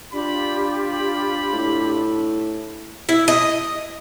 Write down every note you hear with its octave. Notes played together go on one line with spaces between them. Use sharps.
D4 F4 G4 B5
B5
A2
E4
D#5